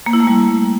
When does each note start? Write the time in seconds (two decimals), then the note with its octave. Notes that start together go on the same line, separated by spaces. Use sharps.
0.06 A#3
0.13 E4
0.20 A3
0.27 G3